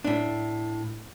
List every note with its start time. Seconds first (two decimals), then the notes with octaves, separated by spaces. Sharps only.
0.04 A2 D4